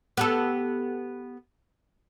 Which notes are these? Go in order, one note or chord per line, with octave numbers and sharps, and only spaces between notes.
B3 G4 A4